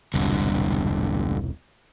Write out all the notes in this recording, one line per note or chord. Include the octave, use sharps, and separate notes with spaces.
E1 C2 G2 A#2 D3